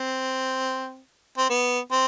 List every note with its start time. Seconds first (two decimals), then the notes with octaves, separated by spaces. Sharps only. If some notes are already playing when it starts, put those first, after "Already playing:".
Already playing: C4
1.38 C4
1.50 B3
1.91 C4